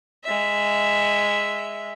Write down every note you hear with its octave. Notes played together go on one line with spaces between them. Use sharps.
G#3 E5